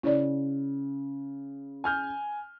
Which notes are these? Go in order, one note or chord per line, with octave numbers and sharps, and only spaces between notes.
C#3 E4 C#5 D5
G#5 F6 G6